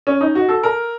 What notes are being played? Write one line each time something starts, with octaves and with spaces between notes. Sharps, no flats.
C#4
D#4
F#4
A4
A#4